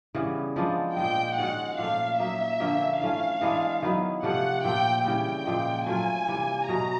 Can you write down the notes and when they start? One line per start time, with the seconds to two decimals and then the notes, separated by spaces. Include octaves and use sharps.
0.15 C#3 E3 G3 B3
0.56 F3 G#3 B3 D4
0.97 A#2 F3 G#3 G5
1.37 D#3 G#3 C#4 F#4 F#5
1.78 A#2 F3 A3 F5
2.19 F#3 A#3 D#4 E5
2.60 D3 F3 A#3 C#4
3.01 E3 A3 C#4 F5
3.41 E3 G#3 B3 D4
3.82 D#3 F#3 B3 E4
4.23 C3 F3 A3 C#4 F#5
4.63 A#2 F3 A3 C4 G5
5.05 C#3 E3 G3 G5
5.45 A#2 F3 G#3
5.86 F#3 A3 C4 F4 G#5
6.27 C3 E3 G3 A#3
6.68 B2 F#3 A3 A#5